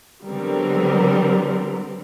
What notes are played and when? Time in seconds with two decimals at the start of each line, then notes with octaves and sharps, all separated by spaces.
0.25 D3 F#3 G3 B3 C4 A#4